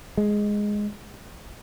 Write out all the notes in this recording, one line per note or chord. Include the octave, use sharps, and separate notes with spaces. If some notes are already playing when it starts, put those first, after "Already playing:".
G#3